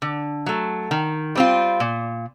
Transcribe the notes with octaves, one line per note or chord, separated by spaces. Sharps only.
D3
F#3 A3
D#3
G3 C4 F4
A#2